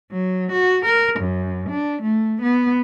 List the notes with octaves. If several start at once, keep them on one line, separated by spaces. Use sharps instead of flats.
F#3
F#4
A#4
F#2
D4
A3
B3